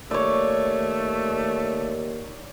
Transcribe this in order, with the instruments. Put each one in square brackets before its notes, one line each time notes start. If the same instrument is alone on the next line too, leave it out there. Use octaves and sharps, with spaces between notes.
[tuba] D#2 [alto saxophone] A3 [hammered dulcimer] C#5 D5